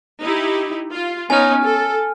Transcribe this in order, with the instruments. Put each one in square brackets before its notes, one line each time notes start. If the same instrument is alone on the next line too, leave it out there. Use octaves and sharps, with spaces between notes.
[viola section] D#4 E4 G4
F4
[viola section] B3 C#4 D#4 [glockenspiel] G#5 F6
[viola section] A4